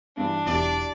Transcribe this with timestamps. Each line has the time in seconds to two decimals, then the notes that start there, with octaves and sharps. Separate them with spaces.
0.17 G2 E3 D4
0.46 E1 F#3 E4 G4 D5